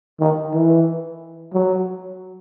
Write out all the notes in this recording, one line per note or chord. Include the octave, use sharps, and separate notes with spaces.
D#3
E3
F#3